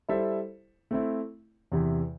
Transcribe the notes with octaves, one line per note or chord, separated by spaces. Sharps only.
G3 E4 A4 C5 E5
A3 C4 E4
E2 C3 E3